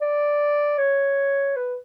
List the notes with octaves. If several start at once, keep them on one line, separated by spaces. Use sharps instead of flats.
D5
C#5
B4